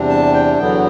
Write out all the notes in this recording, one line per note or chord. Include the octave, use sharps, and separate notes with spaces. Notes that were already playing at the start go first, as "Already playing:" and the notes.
Already playing: E2 C3 G3 D4
A5
G5
E2 D3 F#3 B3 G5